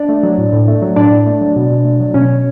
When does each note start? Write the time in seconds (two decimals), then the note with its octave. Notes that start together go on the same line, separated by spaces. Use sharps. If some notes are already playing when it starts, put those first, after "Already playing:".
Already playing: D4 D5
0.09 A3
0.23 F#3
0.38 A2
0.53 A2
0.68 A3
0.82 F#3
0.96 A2 D4 D5
1.11 A2
1.26 A3
1.41 F#3
1.56 B2
1.71 B2
1.85 A3
2.00 F#3
2.14 B2 C#4 C#5
2.30 B2